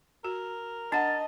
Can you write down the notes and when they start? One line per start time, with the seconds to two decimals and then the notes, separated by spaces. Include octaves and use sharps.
0.25 F#4 A#4
0.92 D4 D#5 F#5 A5